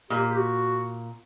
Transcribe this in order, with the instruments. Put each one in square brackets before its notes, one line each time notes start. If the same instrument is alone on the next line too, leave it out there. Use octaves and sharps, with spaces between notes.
[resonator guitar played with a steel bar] A#2 [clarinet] G4
[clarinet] G4
F#4